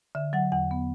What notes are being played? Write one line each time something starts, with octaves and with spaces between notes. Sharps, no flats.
D3 E5
F#3 F#5
E2 F#5
B3